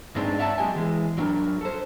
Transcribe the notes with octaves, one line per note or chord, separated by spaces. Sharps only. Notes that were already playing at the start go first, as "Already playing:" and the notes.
G2 G#3 C4 D4 D#4
C#5 D5 E5 F#5 A5
F#3 G#3 G4 D#5 G#5
E3 G#3
F#3 G3 D4 A#4
A4 C5